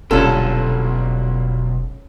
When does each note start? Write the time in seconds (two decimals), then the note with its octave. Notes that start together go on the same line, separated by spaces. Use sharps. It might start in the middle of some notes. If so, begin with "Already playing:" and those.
0.11 E1 B1 A#2 D3 G3 C#4 A4